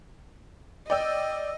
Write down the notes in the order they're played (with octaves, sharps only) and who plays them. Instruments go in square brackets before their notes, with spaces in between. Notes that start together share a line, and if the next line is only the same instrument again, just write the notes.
[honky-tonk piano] D5 G5 E6 [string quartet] D#5